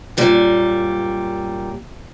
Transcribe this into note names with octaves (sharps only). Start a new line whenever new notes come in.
F#2 A#2 G3